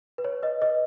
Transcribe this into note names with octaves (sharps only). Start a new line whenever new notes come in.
B4
C#5
B4 D#5
B4 D#5